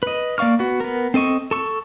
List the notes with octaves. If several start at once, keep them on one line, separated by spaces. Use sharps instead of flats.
B4 D#5
A#3 D5 F5 C#6 F6
B3 F#4
B3 A#4
C4 A4 D#5 C#6
A4 C#6 E6